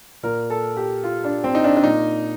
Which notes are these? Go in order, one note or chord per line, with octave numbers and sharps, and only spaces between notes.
A#2 A#4
A4
G4
F4
D4
C4
D#4
D4
D4
A#2 D#4